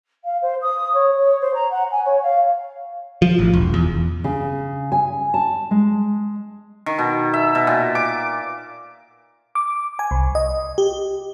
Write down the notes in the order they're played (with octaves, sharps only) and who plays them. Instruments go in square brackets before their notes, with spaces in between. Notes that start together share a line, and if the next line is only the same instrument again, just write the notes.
[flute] F5
C5
D#6
C#5
C#5
C5
A#5
F#5
G#5
C#5
F5
[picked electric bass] F3
A1
E1
E2
[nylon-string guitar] C#3
G#5
A5
G#3
[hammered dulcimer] D#3
B2
E5
B2
A#2
D6
[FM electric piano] D6
G#5
C2
D#5
G4